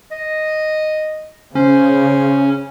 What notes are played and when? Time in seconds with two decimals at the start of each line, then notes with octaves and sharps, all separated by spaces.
0.12 D#5
1.55 C#3 C#4 C5